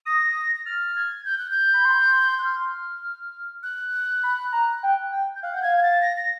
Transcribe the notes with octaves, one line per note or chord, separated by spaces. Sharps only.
D#6 A#6
A#6
F6 A6
G#6
G6
F#6
G6
B5
C6
F#6
F6
F#6
B5
A#5
G5
G5
G6
F5 F#6
F#5 G6
F5 G#6
G#6
A6
A#6
A#6